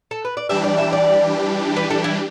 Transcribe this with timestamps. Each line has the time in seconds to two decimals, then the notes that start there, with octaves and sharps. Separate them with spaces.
0.11 A4
0.25 B4
0.37 D5
0.49 E3 G3 D4 G4 E5
0.64 D5
0.78 E5
0.93 D5
1.76 B4
1.90 A4
2.04 E4